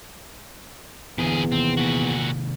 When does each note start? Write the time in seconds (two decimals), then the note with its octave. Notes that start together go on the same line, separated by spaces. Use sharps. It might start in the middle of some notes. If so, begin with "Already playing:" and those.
1.18 E2 A#2 D3 B3 G#4
1.52 C3 D#3 A#3 C4
1.77 A#2 F#4